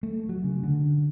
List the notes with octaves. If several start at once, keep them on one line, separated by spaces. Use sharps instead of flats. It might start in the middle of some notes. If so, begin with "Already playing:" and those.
A3
F#3
C#3
D3